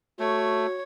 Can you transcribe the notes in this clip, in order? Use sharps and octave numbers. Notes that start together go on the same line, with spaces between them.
A3 F#4 C#5